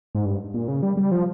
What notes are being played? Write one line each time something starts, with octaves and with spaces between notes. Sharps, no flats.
G#2
G2
A#2
C#3
G3
G3
F3